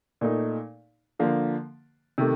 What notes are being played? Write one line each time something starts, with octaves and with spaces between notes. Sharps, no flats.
A#2 A3 D#4
D3 F3 A#3
C3 D#3 A3